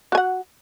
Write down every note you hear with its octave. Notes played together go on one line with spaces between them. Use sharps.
F#4 F#5 G#5